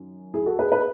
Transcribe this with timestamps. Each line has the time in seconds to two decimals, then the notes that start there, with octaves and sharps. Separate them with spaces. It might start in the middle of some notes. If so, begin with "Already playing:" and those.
Already playing: F#2 D#3
0.34 E4 G#4
0.46 F#4 A4
0.59 G#4 B4
0.72 G#4 B4